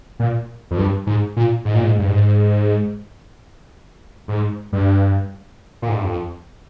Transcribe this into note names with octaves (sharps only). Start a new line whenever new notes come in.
A#2
F2
G2
G#2
A#2
G#2
A#2
G#2
G2
G#2
G#2
G2
A#2
G#2
G2
F2